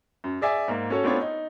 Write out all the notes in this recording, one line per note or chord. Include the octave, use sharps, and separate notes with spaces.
F#2
G#4 D5 E5 G#5
G#2 A#3
C#4 F#4 A4 C#5
A3 B3 C4 D4 F4 C#5
D#4